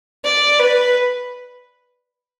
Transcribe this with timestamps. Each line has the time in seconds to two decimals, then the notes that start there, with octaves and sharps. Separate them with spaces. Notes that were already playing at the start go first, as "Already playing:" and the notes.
0.25 D5
0.59 B4